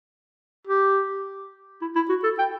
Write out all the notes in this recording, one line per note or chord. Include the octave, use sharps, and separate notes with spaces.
G4
E4
E4
F#4
A4
G5